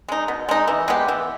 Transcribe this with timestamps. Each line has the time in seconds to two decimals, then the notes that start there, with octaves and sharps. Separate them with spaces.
0.08 G#3 D#4
0.28 B2
0.49 G#3 D#4
0.68 E3
0.88 G#3 B3 G4
1.08 E3